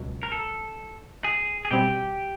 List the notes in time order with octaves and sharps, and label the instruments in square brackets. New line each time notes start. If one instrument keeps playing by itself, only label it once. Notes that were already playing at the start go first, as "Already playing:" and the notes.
Already playing: [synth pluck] C#2 B2 F#3
[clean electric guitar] A#4
A4
G#4
G#4
[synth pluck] B2 G3 C4 [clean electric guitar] G4